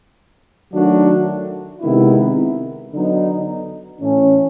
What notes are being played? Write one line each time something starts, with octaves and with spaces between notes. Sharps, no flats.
D#3 F#3 A3 D4 F#4
C3 D#3 G#3 B3 E4
D3 F#3 B3 D#4
A2 E3 A3 C#4